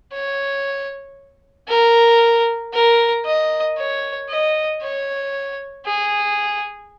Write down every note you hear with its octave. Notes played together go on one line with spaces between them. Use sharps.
C#5
A#4
A#4
D#5
C#5
D#5
C#5
G#4